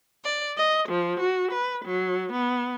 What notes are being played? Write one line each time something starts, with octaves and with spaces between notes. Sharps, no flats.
D5
D#5
F3
F#4
B4
F#3
B3